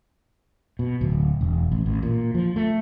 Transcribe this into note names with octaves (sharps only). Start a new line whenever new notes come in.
B2
D1
E1
A1
A1
A#2
F3
A3